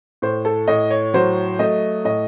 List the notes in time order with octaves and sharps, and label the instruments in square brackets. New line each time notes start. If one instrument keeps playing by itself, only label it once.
[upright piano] A2 C5
A4
A2 D#5
C#5
F#3 C5
A3 D#5
A2 D#5